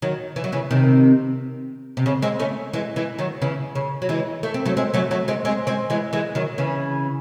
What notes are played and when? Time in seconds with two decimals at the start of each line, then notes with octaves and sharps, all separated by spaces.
0.02 D#3 F#3
0.36 E3
0.44 F#3
0.52 C#3 E3
0.71 C3 D#3
1.97 C3
2.06 C#3
2.22 G#3 C4
2.39 A3 C#4
2.73 E3 G#3
2.96 E3 G#3
3.18 D#3 F#3
3.42 C#3 E3
3.75 C#3
4.02 F#3
4.09 E3 G#3
4.43 A3
4.54 C4
4.65 F#3 A3
4.77 G#3 C4
4.94 F#3 A3
5.11 F#3 A3
5.28 G#3 C4
5.45 G#3 C4
5.67 G#3 C4
5.90 E3 G#3
6.13 E3 G#3
6.35 D#3 F#3
6.58 C#3 E3